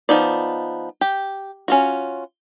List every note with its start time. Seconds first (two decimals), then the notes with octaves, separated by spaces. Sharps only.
0.09 F3 B3 D#4 D5
1.01 G4
1.68 C#4 F4 F#4